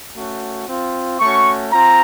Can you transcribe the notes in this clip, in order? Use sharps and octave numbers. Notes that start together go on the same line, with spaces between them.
A3 C#4 F#4
C4 F4
A3 C#4 F#4 C#6
C4 F4 A#5